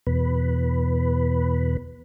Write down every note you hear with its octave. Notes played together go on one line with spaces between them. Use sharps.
E2 B2 B4